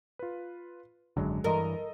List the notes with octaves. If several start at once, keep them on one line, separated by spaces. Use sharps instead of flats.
F4 B4
G#1 F#2 D3 F#3 G#3
G2 E3 A4 A#4 D#5 C6